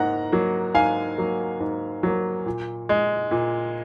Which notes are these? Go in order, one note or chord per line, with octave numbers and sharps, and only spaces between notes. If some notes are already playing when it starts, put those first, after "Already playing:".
Already playing: G#2 A#3 F#5 A#5
F#3 A#3
G#2 F5 G#5
F#3 A#3
G#2
F#3 A#3
A#2
G#3
A#2